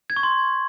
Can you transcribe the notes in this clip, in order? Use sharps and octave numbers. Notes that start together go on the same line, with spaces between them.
G#6
C#6
C6